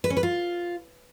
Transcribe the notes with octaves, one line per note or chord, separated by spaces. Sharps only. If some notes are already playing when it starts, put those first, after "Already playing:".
B4
C#4
B4
F4